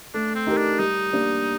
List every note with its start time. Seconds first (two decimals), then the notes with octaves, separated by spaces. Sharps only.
0.14 A3 D4
0.35 C4
0.47 D#4 G4 A#4
0.57 D4
0.79 G3 D#4
1.11 A#3 D4 G4